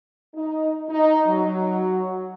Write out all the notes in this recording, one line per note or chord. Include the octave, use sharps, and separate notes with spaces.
D#4
D#4
F#3